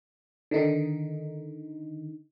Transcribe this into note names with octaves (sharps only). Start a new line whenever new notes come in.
D3 D#3 D#4